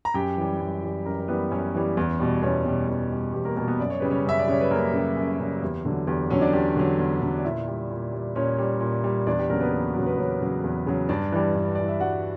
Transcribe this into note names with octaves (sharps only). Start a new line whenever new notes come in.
A#5
F#2 G4 G5
E3 G3
F#2
E3 G3
F#2 A#4 A#5
A#4
E3 G3 B3 B4
F#2 C#4 C#5
E3 G3
E2
B2 G3
E2 C#4 C#5
B2 G3
E2
B2 G3
E2 G4
A#3 A#4
B2 G3 A#3 A#4
B3 B4
F#2 D5
C#5
C#3 G3 B4
C#4 C#5
F#2 E5
D5
C#3 G3 C#5
B4
F#2 A#3 A#4
C#3 G3
F#2
C#3 G3
F#4
E2 G4
D3 F#3
E2 G4
D3 F#3 C#4 C#5
D4 D5
E2 G4
D3 F#3
E2
D3 F#3
D5
A#2 E4 E5
G3
A#2
G3
A#2 C#4 C#5
G3
A#2
G3
E2 D4 D5
G4
C#3 F#3 A#3 A#4
B3 B4
E2
F#4
C#3 F#3
B3 B4
E2 C#4 C#5
C#3 F#3
E2
C#3 F#3
G2 D4 D5
E3 G3
G2
E3 G3 D5
E5
G2 F#4 F#5